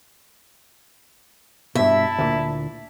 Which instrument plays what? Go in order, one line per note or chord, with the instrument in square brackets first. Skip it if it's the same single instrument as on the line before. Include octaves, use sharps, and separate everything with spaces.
[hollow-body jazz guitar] G2 B2 [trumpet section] E4 A5 [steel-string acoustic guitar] E5
[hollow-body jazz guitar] D2 A#2